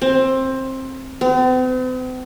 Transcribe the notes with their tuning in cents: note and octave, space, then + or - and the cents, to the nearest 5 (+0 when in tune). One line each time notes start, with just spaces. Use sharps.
C4 +15
C4 -45